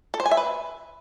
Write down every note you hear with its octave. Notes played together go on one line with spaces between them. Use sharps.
A4
C5
G#5
E5
B4